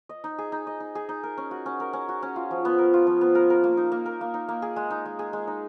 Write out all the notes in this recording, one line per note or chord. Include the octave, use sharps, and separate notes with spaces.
D#5
D#4
G#4
D#4
D#5
D#4
G#4
D#4
A#4
C#4
F#4
C#4
A#4
C#4
F#4
C#4
F4
F3
B3
A#4
F4
F3
B3
A#4
A#4
A#3
D#4
A#3
A#4
A#3
D#4
A#3
G#4
G#3
D#4
G#3
G#4
G#3
D#4